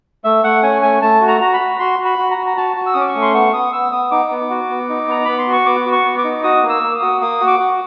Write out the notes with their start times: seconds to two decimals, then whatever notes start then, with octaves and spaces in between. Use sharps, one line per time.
0.24 A3 E5
0.44 A3 F#5
0.63 C#4 G#5
0.82 A3 G#5
1.02 A3 A5
1.21 F#4
1.28 A#5
1.41 F#4 A#5
1.54 B5
1.60 F#4
1.79 F#4 C6
1.99 F#4
2.05 B5
2.18 F#4
2.31 A#5
2.38 F#4
2.46 A#5
2.57 F#4 A5
2.77 F#4
2.86 E6
2.93 C#4 D#6
3.01 D6
3.08 C#6
3.15 A3
3.22 C6
3.34 B3 C#6
3.53 B3 D#6
3.73 B3 E6
3.92 B3 D#6
4.11 D#4 D6
4.31 B3
4.50 F#4
4.70 B3
4.89 D#4
5.08 B3 A#5
5.25 B3 B5
5.39 C6
5.47 F#4
5.53 C#6
5.66 B3 D6
5.86 F#4
5.92 C#6
6.05 B3
6.18 D6
6.24 D#4
6.43 F#4 D#6
6.63 A#3
6.69 E6
6.83 A#3
6.95 D#6
7.02 F#4
7.21 A#3 D#6
7.40 F#4
7.47 D6
7.59 F#4